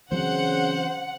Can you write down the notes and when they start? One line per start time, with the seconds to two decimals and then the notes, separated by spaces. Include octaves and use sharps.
0.11 C#3 E3 F#3 C4 C5 F#5